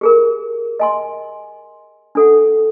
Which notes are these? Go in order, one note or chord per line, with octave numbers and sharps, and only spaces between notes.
G4 G#4 A#4
D#5 G#5 C6
D4 A4 F#5